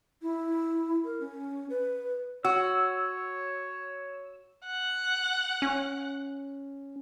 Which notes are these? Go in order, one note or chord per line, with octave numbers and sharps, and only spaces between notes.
E4
A#4
C#4
B4
F#4 C#5 E6
F#5
C#4